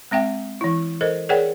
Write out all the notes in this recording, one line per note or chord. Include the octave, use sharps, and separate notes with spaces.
G#3 C4 E5 G5
E3 E4
A4 A#4 C5 D#5
G#4 A#4 C#5 D5 F#5 G5